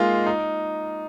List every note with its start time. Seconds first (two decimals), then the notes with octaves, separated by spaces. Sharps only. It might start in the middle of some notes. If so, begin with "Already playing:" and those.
Already playing: G#3 A#3 D#4 F4
0.26 D#4